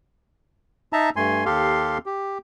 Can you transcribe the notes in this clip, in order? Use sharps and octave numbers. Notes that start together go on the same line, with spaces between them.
D#4 E5 A5 A#5
G2 A3 G#5 C6
D#2 G4 A4 F5 C6
G4